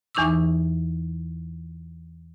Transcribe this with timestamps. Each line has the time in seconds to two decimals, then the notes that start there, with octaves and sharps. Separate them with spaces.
0.15 E2 E3 D#4 C#6 D6 E6